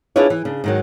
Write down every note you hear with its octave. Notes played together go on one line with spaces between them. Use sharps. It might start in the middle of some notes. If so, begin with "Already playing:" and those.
D4 E4 F4 G#4 B4 C#5
E3
C#3 D4
G#2 D#3 F#3